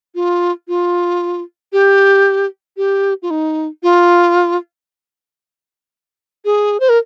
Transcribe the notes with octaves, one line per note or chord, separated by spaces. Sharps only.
F4
F4
G4
G4
F4
D#4
F4
G#4
C5
A#4